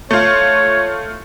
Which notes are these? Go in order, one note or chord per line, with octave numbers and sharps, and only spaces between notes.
A3 F4 C#5